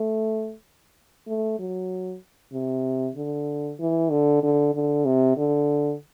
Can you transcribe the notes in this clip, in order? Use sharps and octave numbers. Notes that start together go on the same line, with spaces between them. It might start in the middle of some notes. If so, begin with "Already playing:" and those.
Already playing: A3
A3
F#3
C3
D3
E3
D3
D3
D3
C3
D3